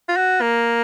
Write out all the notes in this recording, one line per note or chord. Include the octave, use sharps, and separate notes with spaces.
F4
F#4
A#3